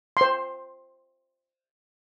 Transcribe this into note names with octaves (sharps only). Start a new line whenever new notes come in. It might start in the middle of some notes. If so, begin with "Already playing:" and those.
C5 C6